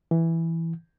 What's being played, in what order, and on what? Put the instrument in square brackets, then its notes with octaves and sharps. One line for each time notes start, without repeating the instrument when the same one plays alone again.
[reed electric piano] E3